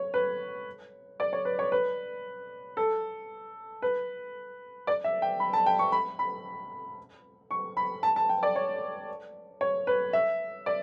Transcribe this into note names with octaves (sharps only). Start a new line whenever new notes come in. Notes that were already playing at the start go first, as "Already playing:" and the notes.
Already playing: C#5
B4
D5
C#5
B4
C#5
B4
A4
B4
D5
E5
G5
B5
A5
G5
C#6
B5
B5
C#6
B5
A5
A5
G5
D5
C#5
C#5
B4
E5
D5